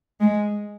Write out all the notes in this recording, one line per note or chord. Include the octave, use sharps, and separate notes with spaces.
G#3